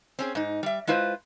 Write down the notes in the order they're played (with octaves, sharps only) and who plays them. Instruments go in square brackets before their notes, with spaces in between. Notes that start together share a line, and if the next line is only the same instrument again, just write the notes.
[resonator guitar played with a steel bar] C4 C#4 G#4
G#2 D#4
G3 E5
G#3 E4 F4 B4 C5